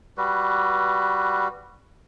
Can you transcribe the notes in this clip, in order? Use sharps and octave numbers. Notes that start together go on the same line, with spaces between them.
G3 F#4 B4